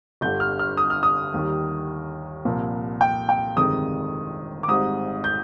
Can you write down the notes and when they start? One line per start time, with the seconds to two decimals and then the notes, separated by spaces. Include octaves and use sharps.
0.21 G1 G2 D3 G3 G6
0.40 F6
0.59 F6
0.77 D#6
0.90 F6
1.03 D#6
1.34 D#2 D#3 G3
2.45 C2 A#2 F3
3.01 G5
3.29 G5
3.56 G1 F2 C3 D#3 G#3 D#6
4.63 D6
4.68 G#1 G#2 G3 C4 D#6
5.24 G6